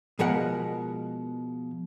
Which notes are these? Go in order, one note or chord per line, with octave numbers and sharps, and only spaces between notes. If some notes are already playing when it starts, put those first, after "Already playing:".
B2 F3 G#3 A#4 F#5